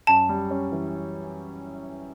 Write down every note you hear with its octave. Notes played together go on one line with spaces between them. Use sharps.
F#2 A5
G3
C#4
E3